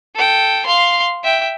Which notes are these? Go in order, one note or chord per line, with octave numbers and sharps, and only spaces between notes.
A4 G5
F5 C6
E5 G5